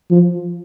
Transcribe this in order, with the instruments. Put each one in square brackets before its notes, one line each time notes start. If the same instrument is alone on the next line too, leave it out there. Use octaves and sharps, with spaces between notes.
[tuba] F3